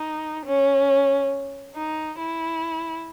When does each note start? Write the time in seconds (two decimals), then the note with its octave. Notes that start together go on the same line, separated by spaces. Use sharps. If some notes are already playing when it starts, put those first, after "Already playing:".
Already playing: D#4
0.45 C#4
1.75 D#4
2.19 E4